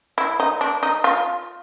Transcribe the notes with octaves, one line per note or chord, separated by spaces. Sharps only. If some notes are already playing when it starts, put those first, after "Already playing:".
E4
D#4
D4
D#4
F4